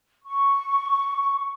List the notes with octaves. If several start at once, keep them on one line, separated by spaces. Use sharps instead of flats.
C#6